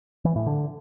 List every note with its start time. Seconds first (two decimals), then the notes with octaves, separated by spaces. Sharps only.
0.25 E3
0.36 A2
0.47 D3